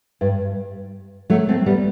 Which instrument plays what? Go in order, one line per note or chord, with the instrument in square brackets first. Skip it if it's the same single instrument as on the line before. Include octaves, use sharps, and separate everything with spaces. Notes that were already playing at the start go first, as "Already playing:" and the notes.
[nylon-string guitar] G2
F#3 A3
A3 C4
G3 B3